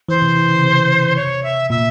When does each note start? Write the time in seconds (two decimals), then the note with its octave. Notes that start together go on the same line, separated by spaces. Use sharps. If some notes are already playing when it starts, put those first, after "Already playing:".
0.09 E3 C5
0.22 C3
0.36 E3
0.49 C#3
0.63 C3
1.16 C#5
1.43 E5
1.70 A#2 E5